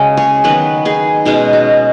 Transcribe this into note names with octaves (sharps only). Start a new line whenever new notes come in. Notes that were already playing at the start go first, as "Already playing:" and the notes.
Already playing: C#3 G#3 C#4 F#4 D#5
G#4 C#5
D#3 F#3 B3 F#4 B4
D#4 G#4
B2 G#3 C#4 D#4 G#4
F#4